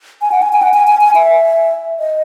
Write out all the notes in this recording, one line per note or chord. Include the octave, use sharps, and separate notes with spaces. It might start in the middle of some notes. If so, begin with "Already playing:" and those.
G#5
F#5
G#5
G#5
F#5
G#5
G#5
G#5
E5
D#5